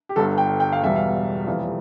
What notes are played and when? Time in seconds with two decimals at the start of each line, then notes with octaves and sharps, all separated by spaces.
0.09 G4
0.16 G1 G2 D3 A4
0.38 G5
0.60 G5
0.72 F5
0.82 E1 E2 B2 G3 E5
0.96 F5
1.47 F1 F2 E3 G3 F5